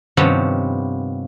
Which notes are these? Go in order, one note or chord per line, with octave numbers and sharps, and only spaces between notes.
G2 C3 D#3 F3 B3 C#4